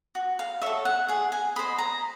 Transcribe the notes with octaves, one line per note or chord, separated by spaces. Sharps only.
F#4
F5
A4 C#5 E5
F#5
G#4 F#5
G#5
C5 D#5 B5
A#5